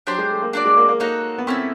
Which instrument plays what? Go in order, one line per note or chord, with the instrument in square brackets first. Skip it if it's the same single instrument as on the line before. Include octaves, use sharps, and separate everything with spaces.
[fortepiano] F#3 [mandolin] D4 G4 C5
[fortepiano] G#3
A3
A#3
[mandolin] D4 F#4 A4 D5
[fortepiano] G#3
A#3
A#3
[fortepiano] A#3 [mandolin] D#4 F#4 A4 C#5
[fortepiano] B3
[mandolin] A3 C#4 E4 [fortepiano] C4